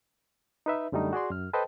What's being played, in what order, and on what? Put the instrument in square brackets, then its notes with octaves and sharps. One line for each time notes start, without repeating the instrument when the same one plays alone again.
[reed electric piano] D#4 B4 E5
F#2 D3 G3 A3 D#4
F#4 G#4 D5 C6
F#2 F6
A4 B4 C5 D#5 G5 A5